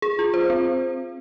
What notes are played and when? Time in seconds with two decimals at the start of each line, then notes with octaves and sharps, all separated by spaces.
0.02 G#4
0.19 F4
0.34 C5
0.50 C4